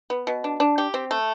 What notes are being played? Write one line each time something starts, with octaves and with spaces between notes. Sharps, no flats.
B3
B2
D4
D4
G4
C4
A3